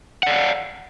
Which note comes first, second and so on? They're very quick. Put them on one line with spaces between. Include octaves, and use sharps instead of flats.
F#5 D5 F5